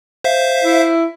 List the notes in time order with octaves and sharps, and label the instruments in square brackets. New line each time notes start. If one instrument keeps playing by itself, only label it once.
[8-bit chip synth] C5 E5 F5
[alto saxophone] E4